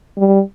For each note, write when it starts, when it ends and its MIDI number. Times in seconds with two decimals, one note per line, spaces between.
0.18 0.41 55